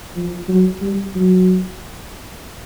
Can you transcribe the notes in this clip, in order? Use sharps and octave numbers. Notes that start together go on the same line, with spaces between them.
F3
F#3
G3
F#3